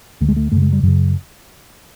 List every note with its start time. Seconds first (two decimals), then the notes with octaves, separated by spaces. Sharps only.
0.21 D2 D3 A3
0.29 G#3
0.37 A3
0.52 F#2 C#3 A3
0.62 G#3
0.73 G3
0.83 F#2 C#3 F#3